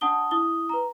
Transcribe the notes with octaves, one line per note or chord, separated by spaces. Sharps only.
D4 F#5 A5 D#6 G7
E4 D#6 G7
B4 A#5